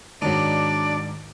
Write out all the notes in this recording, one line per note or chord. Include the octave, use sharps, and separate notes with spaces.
G#2 D#3 F#3 D4 D#4 D5